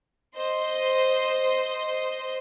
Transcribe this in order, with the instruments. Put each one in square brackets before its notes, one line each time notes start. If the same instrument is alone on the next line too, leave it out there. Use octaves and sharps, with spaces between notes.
[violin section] C5 D#5